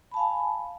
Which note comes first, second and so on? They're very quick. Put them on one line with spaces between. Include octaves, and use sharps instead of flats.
B5 A5 F5 G#5